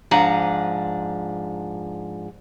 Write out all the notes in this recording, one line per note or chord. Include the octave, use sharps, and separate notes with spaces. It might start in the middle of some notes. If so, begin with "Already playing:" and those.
G#2 F3 D4 A#5